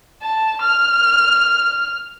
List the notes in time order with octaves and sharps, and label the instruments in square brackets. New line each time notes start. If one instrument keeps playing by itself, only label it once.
[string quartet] A5
F6